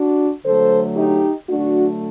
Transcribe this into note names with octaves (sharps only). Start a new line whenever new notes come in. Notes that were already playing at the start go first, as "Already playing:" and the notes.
Already playing: D4 F#4
D3 F#3 A3 A4 C5
D#4 G4
D3 F#3 A3 D4 F#4